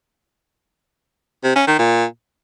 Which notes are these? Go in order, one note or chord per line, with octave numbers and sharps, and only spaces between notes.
C3
C#4
D#3
A#2